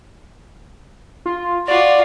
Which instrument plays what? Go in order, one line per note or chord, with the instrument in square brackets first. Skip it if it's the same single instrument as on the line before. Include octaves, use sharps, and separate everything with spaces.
[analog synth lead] F4
[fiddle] F4 F#4 [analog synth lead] D5